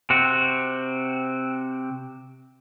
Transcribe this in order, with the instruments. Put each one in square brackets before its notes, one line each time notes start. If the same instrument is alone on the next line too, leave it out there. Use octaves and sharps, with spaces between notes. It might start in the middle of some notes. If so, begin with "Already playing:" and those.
[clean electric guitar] C3 C4 F#4